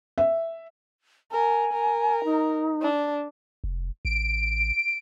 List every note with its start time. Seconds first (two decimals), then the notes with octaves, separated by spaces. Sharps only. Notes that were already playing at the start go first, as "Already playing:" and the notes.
0.18 E5
1.32 A#4 G#5
1.73 A#4
2.24 D#4
2.82 D4
3.64 F1
4.05 A1 D7